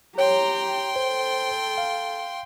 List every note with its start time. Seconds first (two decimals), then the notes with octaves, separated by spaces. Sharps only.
0.18 G4 C#5 G5 A#5 C6
0.96 A4 C5
1.78 F5